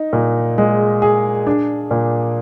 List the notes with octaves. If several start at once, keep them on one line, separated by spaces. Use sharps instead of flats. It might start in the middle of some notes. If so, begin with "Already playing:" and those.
Already playing: D#4
A#2
G#3
G#4
D4
A#2